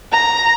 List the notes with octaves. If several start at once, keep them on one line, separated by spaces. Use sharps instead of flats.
A#5